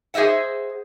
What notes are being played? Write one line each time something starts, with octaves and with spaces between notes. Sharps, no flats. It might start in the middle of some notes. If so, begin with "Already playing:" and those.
G#4 C5 D#5 E5 F#5